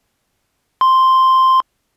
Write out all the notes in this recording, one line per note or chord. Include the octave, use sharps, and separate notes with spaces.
C6